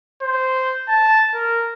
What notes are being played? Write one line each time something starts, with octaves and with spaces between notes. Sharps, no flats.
C5
A5
A#4